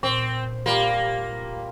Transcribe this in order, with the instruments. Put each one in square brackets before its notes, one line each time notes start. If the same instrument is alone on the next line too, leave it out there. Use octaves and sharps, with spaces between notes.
[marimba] A#2 [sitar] C4
[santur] G3 F4 [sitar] A#3 [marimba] G4